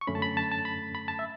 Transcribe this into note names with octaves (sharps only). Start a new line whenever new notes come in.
C#6
F#2 D3 A3 C#4 B5
A5
B5
A5
A5
B5
B5
A5
E5